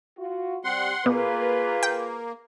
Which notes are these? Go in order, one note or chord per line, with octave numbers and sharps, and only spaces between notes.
F4 F#4
G3 C4 F#5 C6
B2 A#3 F4 G#4 B4
G5